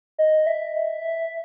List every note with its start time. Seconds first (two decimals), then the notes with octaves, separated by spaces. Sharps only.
0.19 D#5
0.47 E5